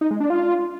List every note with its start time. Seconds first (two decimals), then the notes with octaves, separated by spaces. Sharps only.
0.01 D#4
0.11 G#3
0.20 D4
0.30 F4